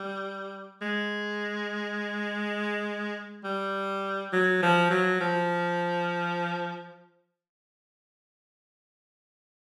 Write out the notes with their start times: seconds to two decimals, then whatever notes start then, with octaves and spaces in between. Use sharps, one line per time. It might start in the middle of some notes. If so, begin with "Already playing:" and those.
Already playing: G3
0.81 G#3
3.44 G3
4.33 F#3
4.63 F3
4.91 F#3
5.21 F3